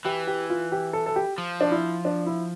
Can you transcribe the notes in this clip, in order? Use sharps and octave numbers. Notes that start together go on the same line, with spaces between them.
E3 G4
G4
F4
G4
A4
A4
G4
F3
D4
E4
D4
E4